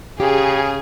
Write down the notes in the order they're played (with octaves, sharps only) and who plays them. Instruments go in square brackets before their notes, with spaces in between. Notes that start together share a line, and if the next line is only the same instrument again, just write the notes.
[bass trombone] C#3 [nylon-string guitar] G4 [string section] G#4